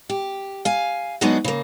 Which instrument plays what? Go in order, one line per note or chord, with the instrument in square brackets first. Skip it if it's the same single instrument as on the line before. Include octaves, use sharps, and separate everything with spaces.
[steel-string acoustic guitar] G4
F5 G#5
F#3 G#3 B3 D4 D#4 F#4
C#3 A#3